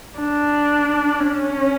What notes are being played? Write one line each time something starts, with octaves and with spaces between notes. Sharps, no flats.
D4
C#4